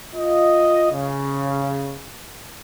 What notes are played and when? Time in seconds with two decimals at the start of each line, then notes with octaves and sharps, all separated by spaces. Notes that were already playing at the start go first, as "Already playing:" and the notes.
0.15 F4 D#5
0.92 C#3